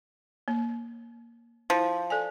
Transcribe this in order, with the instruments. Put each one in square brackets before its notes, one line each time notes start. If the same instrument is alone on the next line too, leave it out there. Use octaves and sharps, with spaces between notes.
[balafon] A#3
[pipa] F3 [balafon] E4
[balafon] A4 D5 G#5